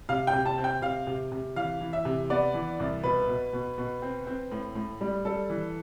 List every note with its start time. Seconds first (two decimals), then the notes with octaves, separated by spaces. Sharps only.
0.09 C3 F5
0.27 G5
0.33 C3
0.46 A5
0.58 C4
0.64 G5
0.82 C3 F5
1.07 C3
1.32 C3
1.56 E3 F5
1.81 E3
1.93 E5
2.05 C3
2.30 B3 D5
2.54 E3
2.80 C2
3.03 B2 B4
3.29 B2
3.53 B2
3.78 B2
4.02 C4
4.27 C4
4.51 A2
4.75 A2
5.01 G3
5.25 G3 A4
5.50 E3